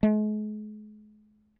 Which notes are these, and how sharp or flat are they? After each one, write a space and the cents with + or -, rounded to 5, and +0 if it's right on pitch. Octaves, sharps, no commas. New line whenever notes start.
G#3 +40